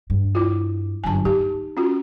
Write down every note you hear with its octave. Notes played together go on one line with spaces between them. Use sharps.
G2
E4 F4
G1 F#2 G#5 A5
D#4 G4
C#4 F4 F#4